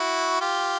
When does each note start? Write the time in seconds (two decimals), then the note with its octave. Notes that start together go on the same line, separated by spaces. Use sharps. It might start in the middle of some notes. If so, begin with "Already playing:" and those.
Already playing: E4 F#4
0.41 F4 G4